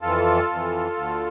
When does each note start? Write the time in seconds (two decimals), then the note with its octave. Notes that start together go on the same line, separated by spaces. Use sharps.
0.02 F2 E3 F4 A4
0.50 F2 E3
0.96 D2 D3